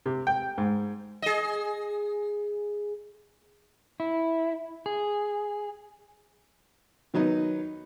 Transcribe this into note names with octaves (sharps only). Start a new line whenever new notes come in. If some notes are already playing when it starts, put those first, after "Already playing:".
C3
G5
G#2
G#4 D#5
E4
G#4
D#3 F#3 B3 D#4